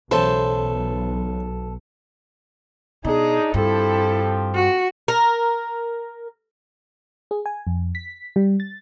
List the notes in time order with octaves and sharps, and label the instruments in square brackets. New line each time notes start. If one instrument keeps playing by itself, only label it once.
[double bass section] B1 [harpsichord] C#3 E3 [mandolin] A4 [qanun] C5 A5
[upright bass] B2 [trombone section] D4 D#4 [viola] G#4
[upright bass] G2 [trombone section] F3 C4 G4 [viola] E4 A4
[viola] F#4
[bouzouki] A#4
[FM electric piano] G#4
G#5
F2
B6
G3
A6